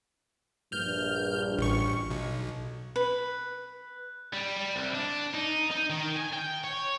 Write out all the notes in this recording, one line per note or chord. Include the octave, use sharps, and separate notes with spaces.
A#1 G2 F6 G6
A1 C#6
B1
B4
G3
G3
C2
D4
D#4
D#4
D#3
G#5
G5
C#5